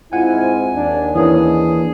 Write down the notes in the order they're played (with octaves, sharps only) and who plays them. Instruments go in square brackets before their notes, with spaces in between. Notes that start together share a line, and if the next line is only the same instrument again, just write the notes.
[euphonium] G#2 [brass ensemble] C4 E4 F4 [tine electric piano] F#5 [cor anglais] G#5
[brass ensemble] D#2 [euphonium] D4
[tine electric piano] E3 A#3 D4 [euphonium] C#4 [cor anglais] G#4